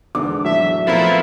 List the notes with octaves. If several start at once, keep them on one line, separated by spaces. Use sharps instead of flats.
E2 G#2 D3 D6
A2 F#3 E5
F3 A3 B3 C4 E4 A#4